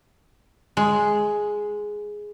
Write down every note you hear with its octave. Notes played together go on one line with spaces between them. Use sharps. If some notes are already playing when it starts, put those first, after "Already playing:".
G#3